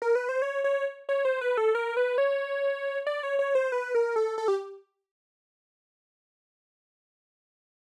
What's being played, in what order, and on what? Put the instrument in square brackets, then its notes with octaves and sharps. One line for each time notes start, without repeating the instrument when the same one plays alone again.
[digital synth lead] A#4
B4
C5
C#5
C#5
C#5
C5
B4
A4
A#4
B4
C#5
D5
C#5
C#5
C5
B4
A#4
A4
A4
G4